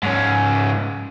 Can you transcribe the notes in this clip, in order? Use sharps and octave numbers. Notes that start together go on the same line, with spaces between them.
G#2 C#4